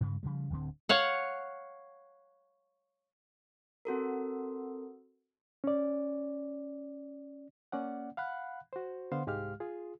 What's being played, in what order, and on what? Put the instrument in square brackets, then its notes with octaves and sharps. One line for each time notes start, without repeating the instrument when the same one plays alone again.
[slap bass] G2 C#3 G#3
C#3 F3 G3
D1 D2 D3 C4
[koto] C#5 F5 F#5
[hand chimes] C4 F#4 A4 A#4
[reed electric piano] C#4 D5
A#3 C#4 D5 F#5
F5 F#5 B5 F#6
F#4 C5
D3 B3 C5 F5 F#5 C6
C2 G#2 G#3 G4 F5 F6
F4 G#4